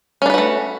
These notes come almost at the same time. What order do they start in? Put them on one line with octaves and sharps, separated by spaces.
C#4 D4 B4 F#4 A3